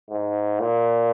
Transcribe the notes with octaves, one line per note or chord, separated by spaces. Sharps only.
G#2
A#2